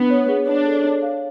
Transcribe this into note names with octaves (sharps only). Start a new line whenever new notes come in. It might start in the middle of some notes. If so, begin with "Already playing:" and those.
Already playing: B3 D4
C#5
G#4
D4 C#5
A4
C#5
F5